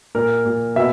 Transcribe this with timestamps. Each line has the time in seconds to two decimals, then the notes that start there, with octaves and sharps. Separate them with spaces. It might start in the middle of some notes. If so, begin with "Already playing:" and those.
0.15 A#2 A#4
0.45 A#2
0.76 B2 E5